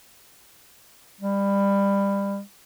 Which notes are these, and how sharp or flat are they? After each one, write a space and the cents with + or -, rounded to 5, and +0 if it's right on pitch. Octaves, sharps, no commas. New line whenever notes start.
G3 +25